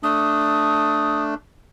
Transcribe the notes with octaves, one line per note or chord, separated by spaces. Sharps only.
A3 D4 D#6